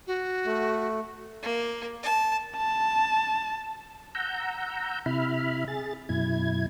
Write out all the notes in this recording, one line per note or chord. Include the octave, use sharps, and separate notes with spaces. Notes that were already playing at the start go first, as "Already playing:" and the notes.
F#4
A3
A#3
A5
A5
F#5 A#5 E6 G6
C3 E4 E5 B5 F6
G#4 A6
F#2 B2 E4 G#6